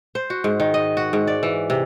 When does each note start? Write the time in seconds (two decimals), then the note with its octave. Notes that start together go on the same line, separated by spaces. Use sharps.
0.15 C5
0.30 F#4
0.44 G#2
0.60 D#3
0.74 D#5
0.97 F#4
1.13 G#2
1.27 D5
1.43 E3
1.70 C3